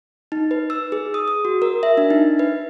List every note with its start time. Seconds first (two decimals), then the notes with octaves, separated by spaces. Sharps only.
0.32 D#4
0.51 B4
0.70 E6
0.92 G#4
1.14 D#6
1.28 D#6
1.45 F#4
1.62 A#4
1.83 E5
1.97 D4
2.10 D#4
2.39 B4